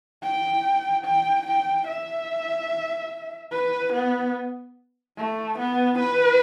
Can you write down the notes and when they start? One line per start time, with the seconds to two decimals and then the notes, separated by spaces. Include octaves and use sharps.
0.23 G5
1.05 G5
1.47 G5
1.88 E5
3.52 B4
3.93 B3
5.17 A3
5.59 B3
5.99 B4